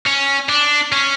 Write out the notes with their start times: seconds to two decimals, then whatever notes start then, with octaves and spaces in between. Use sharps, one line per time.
0.06 C#4
0.49 D4
0.92 C#4